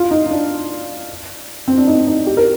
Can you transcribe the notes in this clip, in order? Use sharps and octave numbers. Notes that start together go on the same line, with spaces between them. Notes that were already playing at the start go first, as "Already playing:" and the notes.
Already playing: F4
D#4
D#4
D4
C4
D4
D#4
D#4
G4
A#4